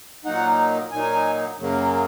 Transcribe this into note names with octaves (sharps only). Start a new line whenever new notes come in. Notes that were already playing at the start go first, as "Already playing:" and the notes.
A#2 F#3 A#3 D#4 F#5
A#2 F#3 A#3 D#4 G#5
F#2 C#3 F#3 A#3